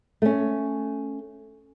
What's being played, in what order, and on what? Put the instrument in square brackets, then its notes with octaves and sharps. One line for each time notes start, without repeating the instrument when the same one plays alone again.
[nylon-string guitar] A3 C#4